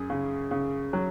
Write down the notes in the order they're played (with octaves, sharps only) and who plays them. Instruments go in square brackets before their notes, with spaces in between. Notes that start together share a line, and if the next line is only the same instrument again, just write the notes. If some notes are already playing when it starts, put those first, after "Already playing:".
Already playing: [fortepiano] F#2 G#4
C#3
C#3
F#3